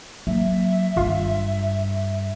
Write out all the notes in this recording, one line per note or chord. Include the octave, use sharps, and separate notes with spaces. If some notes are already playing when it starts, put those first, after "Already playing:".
F#3 A#3 E5
G#1 G2 F4 F5